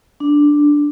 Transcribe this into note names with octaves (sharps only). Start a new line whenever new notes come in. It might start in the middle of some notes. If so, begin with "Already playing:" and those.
D4